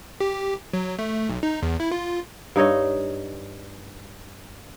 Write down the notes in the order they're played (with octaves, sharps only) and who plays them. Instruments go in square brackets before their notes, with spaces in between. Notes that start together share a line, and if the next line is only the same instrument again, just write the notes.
[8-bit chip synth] G4
F#3
A3
B1
D#4
E2
E4
F4
[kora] G2 D#4 C#5 D#5